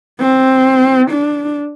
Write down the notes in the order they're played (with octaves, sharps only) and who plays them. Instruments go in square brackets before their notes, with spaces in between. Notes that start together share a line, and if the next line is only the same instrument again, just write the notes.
[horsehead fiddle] C4
D4